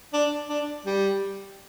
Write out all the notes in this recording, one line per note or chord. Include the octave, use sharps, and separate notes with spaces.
D4
D4
G3